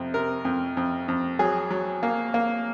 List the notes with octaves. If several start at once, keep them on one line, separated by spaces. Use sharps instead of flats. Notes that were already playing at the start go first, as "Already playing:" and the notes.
Already playing: F2 C3
C3 A#4
F2
F2
F2
F#3 G#4
F#3
A#3
A#3